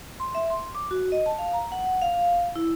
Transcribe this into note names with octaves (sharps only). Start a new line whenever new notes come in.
C6
E5
C6
D6
F#4
D#5
A5
F5
A#5
F#5
F5
E4